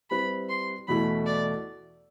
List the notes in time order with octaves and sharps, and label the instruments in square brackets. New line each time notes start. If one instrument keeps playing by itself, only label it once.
[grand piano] G3 C4 E4 B4 [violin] B5
[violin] C6
[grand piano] E2 B2 A3 E4 [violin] B5
[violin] D5